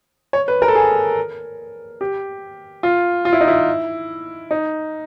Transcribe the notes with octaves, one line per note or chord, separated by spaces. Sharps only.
C#5
B4
A#4
A4
G#4
G4
F4
F4
E4
D#4
E4
D#4